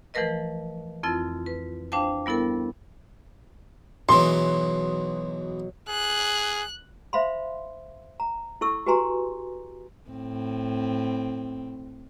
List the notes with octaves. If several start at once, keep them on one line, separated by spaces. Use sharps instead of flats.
E3 F3 A3 A#4 B4 D#5
F2 C4 E4 F4 A6
B4
D4 C5 F5 G5 A5
G3 B3 E4 A4 A#4
B1 B2 E3 F#3 G#3 C6
G#4 F#6
C5 E5 F5 B5 C6
A#5
E4 A4 C#6 E6
F#4 G4 B4 G#5 A#5 C6
A2 C4